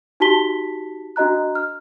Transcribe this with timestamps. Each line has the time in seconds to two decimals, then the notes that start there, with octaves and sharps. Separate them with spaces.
0.20 D#4 F#4 G4 A5 B6 G7
1.16 D4 F#4 D#5 A#5 F#6
1.55 F6